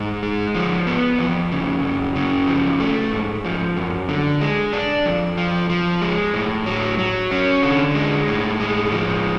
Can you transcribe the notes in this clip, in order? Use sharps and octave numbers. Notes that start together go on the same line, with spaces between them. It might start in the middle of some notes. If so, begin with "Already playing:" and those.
Already playing: G#2
G#3
F3
B3
F2
C#3
F#2
C#3
F3
A3
G#2
F3
F#2
D3
G#3
D4
F2
F3
F3
G#3
A2
F#3
F#3
C#4
D3
G#3
A2
G#3
F3